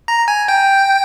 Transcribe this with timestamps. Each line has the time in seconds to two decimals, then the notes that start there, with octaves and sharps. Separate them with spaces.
0.08 A#5
0.28 G#5
0.48 G5